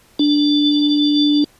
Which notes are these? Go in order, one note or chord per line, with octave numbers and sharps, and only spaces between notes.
D4